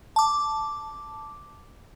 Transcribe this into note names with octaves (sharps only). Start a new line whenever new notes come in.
A5 D6